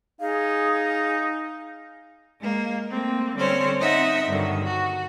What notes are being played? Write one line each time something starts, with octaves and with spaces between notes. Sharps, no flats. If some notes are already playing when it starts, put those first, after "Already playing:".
D#4 G#4 F5
G#3 A#3
A3 A#3 C4
D3 G3 C4 C#4 C5 C#5
C4 D#4 D#5 E5 F#5
G2 D3 D#3 F#3
F#4